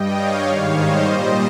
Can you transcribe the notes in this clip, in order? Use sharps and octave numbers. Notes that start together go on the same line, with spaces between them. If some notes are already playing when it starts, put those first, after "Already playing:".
Already playing: G2 G3 D#5 G5
C#5 F5
G#2 D#3 G3
C5 D#5
A#2 G3